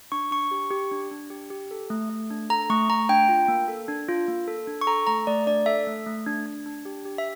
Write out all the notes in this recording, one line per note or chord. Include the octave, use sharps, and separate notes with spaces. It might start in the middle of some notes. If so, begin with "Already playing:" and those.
D4 C#6
D4 C#6
G4
G4
D4
D4
G4
G4
A4
A3
A3
D4
A4 A#5
A3 C#6
A3 A#5
D4 G5
F4
A#3
A4
D4
F4
A#3
A4
D4
C#6
A4 A#5
A3 A#5
A3 D5
D4 D5
A4 E5
A3
A3
D4
D4
D4
G4
G4
E5